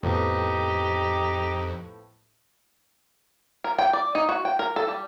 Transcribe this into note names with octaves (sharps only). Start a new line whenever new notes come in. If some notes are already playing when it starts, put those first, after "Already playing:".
F2 A2 F3 B3 D#4 G4
A#4
G5
D5
D#4
F#4
G5
A#4
A4
G3